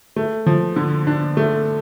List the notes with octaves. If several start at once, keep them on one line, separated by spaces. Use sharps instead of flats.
A3
F3
D3
D4
A3